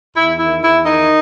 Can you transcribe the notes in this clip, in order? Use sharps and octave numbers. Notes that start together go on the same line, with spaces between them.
E2 E4
D#3 E4
E2 E4
D#3 D#4